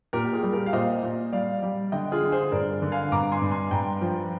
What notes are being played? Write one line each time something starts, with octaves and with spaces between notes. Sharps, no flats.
A#2 G4 A#4
G4
F4 G#4
G3
G4 A#4
F5
A#2 C5 D#5
A#2
G3 D5 F5
G3
D3 D#5 G5
F4 G#4
D3
G#4 C5
G2 A#4 D5
D3
F5 G#5
G2 A#5 D6
G#5 C6
G2
G#5 C6
G2 G5 A#5
F3